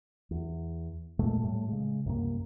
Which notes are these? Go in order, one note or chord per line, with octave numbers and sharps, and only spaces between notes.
E2
E2 A#2 G#3 A3
A2 G3 A3
C#3 G#3
C2 F#2 C3 A#3